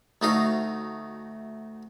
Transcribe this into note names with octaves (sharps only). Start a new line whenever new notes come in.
D2 A3 D#4 F#4 D#5 F5